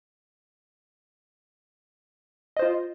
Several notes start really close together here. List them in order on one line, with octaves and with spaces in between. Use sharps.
D#5 C5 F4